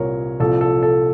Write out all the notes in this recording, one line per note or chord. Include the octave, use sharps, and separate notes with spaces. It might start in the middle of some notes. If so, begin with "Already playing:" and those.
Already playing: C2 A#2 G3 A#4 C#5
C2 A#2 F3 A4
A4
A4